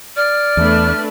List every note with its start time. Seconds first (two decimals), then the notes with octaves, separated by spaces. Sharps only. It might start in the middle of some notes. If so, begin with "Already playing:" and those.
0.16 D5 F6
0.57 E2 A3 D4 B4